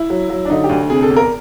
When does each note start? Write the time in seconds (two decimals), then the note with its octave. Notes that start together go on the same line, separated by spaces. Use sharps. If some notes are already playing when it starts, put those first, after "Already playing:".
Already playing: E4
0.10 F#3
0.30 F#3
0.45 D4
0.50 D3 D#4
0.64 G4
0.69 D2
0.89 C3 G#4
1.03 A4
1.10 E2
1.16 A#4